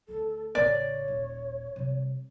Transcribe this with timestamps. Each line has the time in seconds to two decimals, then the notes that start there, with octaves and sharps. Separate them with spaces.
0.09 D2 A4
0.55 A1 C#3 C#5 D5
1.08 D#1
1.76 C3 G3